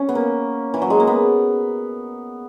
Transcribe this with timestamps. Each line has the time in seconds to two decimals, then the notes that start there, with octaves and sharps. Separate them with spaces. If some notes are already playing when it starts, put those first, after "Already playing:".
Already playing: C#4
0.09 B3
0.15 A#3
0.74 E3
0.82 F#3
0.90 G#3
1.00 A#3
1.07 B3